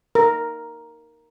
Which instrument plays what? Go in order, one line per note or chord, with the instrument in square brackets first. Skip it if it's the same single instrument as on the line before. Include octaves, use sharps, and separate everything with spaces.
[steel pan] A#4